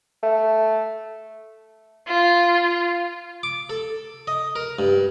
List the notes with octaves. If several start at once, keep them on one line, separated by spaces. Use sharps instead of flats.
A3
F4
D6
A4
D#5
A#4
G2